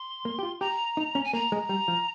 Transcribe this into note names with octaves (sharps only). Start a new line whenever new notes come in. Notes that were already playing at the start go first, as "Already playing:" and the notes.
Already playing: C6
A#3
G4
F4
G4 A#5
D#4
C#4
G#5
A#3 A#5
G#3
G3
F3